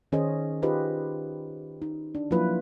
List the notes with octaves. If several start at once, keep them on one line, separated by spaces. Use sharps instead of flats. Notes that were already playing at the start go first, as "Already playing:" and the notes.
D#3 C#4 G#4 C5 D#5
D#4 F4 G4 B4 C5 D#5
D#4
D4
F3 F#3 A#3 E4 F4 B4